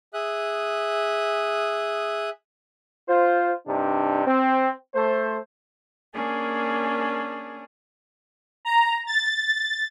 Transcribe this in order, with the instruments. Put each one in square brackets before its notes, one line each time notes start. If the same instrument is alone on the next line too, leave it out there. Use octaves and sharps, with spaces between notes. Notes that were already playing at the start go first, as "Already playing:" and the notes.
[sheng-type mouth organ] G#4 E5 D#6 F#6
[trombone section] F4 C5
G2 C3 D4 D#4
C4
A3 C5
[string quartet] A#3 C#4 D4 G#4
[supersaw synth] A#5
A6